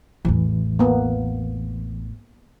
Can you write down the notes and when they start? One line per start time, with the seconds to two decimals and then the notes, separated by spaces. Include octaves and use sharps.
0.25 A1 E2 E3
0.79 A#3 B3